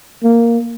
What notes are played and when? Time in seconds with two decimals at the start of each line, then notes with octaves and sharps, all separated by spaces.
0.24 A#3